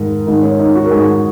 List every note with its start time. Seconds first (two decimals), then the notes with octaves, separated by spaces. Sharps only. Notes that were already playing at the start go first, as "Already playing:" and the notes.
Already playing: G#2 D#3
0.26 G#2 D#3
0.42 C#4
0.59 D#4
0.75 F#4
0.86 A#4
0.91 G#2 D#3 G#4